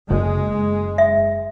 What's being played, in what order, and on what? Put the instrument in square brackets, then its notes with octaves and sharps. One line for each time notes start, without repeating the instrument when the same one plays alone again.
[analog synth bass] F#1 [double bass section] G#3
[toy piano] E5